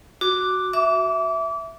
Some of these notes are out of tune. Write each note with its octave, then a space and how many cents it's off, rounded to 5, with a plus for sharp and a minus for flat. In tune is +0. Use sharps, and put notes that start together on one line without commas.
F#4 +0 D6 +0
E5 +0 D6 -30